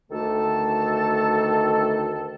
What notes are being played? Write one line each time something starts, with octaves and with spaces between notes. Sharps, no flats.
D2 D#3 A3 A4 A5